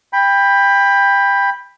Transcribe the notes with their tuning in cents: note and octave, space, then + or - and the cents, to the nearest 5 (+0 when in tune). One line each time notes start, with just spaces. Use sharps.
G5 +20 B5 +0